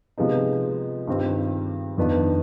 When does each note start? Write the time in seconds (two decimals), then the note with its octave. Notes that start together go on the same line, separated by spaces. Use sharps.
0.18 C3 F3 G#3 B3 D#4
1.07 G2 D#3 G3 C4 F4
1.98 F2 D#3 B3 D4 F4